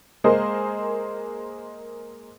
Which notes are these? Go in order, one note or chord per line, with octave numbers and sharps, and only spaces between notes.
G#3 A#3 G#4 A#4 C5 D#5